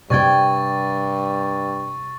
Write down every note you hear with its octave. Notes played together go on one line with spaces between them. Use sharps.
G2 C3 D5 G5 C#6 G#6 A6